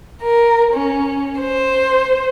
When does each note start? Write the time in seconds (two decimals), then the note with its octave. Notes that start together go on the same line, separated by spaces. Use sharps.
0.21 A#4
0.72 C#4
1.40 C5